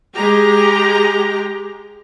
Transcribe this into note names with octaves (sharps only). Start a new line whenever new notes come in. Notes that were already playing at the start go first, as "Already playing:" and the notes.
G#3 G4 A#5